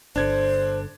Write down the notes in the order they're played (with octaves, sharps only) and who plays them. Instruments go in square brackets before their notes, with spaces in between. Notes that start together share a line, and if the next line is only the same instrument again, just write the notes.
[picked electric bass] G1 D3 [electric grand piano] D4 G#6 [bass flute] C5